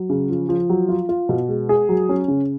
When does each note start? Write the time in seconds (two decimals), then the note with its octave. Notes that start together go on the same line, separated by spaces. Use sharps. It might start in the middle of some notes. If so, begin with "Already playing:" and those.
Already playing: F#3
0.10 C#3
0.29 F3
0.49 F3
0.70 F#3
0.89 F4
1.09 F4
1.29 B2
1.48 G#3
1.69 G#4
1.89 F#3
2.09 C#4
2.28 C#3